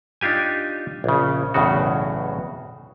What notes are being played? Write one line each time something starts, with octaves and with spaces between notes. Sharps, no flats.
D4 D#4 F4 G4 G#5
A#1 C#3
B1 E2 A2 C#3 F#4